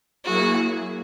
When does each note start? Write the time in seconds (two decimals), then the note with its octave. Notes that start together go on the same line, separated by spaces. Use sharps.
0.24 F#3 A#3 E4 F#4 G#4